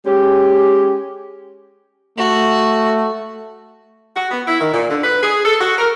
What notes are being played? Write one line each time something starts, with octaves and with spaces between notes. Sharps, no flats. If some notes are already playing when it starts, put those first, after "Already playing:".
G#3 C#4 G4
A3 F#4
F#4
B3
E4
D#3
A#2
D3
B4
G#4
A4
F#4
A#4